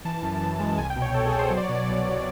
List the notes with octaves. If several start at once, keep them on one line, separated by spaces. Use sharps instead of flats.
E3 A5
F#2
F#2
G#3
A5
C2 G#5
G5
B2
C#5
B2 A4
G#4
B2
C5
F#3 C5
D5
C#5
B2
D5
C2
C2